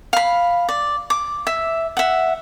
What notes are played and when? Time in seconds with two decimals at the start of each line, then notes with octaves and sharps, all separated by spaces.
0.13 F5 B5
0.69 D5
1.10 D6
1.47 E5
1.97 E5 F#5